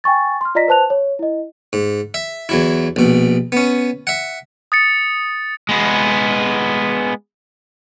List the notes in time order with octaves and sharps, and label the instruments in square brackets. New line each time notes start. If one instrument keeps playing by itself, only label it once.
[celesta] G5 G#5 C#6 A6
C6 F6
F4 D5 D#5 A#5 A#6 B6
B4 C5 A5 F#6 F7
C#5
E4 D#5
[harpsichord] G#2
E5
E2 F#3 E4
A#1 B2
B3 C#4
E5 F#5
[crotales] D#6 A6 C#7
[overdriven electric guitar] G#3 B3